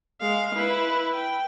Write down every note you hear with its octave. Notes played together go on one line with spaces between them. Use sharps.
G#3 F5
E4 B4
G5